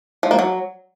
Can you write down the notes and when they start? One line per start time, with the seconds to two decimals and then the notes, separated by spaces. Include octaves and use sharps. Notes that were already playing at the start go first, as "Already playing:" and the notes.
0.23 F3
0.31 A#3
0.39 F#3